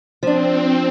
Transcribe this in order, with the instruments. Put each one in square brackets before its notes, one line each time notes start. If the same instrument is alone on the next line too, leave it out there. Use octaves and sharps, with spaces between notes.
[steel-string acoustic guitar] F3 D4 [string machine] C4